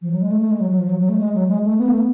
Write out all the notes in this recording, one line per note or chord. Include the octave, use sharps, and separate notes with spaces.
F3
F#3
G#3
A3
A3
G#3
F#3
F#3
F3
F#3
F#3
A3
G#3
F#3
G#3
A3
B3
A3
B3